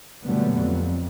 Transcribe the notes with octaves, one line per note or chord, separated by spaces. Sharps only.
A#2 D3 F#3 G3 A3 B3
F2